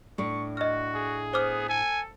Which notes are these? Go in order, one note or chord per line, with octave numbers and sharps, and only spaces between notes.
A2 D4 C#6
F#4 D#5 F6
G#4
B3 C5 D6 F6
A4 G#5